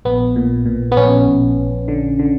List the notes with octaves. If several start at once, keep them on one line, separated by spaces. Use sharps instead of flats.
A#1 B3
A#2
A#2
B3
A#1 C#4
A#1
A#1
D3
D3